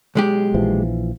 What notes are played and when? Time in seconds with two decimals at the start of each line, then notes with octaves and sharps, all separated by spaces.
0.15 B1 G#3 G4
0.54 A#1 E3 F3